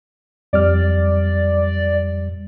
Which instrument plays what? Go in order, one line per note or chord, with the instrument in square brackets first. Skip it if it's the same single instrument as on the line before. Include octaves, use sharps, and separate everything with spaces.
[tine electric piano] F2 G3 F6 [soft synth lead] D5